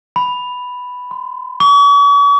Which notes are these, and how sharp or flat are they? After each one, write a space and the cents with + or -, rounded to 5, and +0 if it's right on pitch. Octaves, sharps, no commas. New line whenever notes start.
B5 +5
C6 -30
C#6 +45